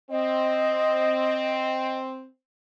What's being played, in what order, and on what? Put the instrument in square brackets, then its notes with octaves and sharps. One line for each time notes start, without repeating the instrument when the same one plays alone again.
[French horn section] C4 [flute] D#5